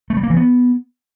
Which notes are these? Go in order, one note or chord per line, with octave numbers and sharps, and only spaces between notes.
A3
G3
A#3
E3
B3